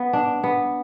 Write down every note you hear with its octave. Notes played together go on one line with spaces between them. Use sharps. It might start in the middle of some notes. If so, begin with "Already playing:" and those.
Already playing: B3
D4
B3